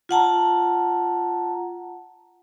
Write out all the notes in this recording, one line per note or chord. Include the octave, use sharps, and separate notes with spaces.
F4 F#5 A5 A#5